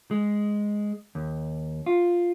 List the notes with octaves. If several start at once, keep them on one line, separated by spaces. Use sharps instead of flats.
G#3
D#2
F4